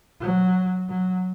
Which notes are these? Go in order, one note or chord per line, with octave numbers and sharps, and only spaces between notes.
F#3
F#3